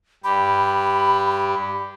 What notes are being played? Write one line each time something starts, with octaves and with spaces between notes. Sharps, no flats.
G2 G4 B5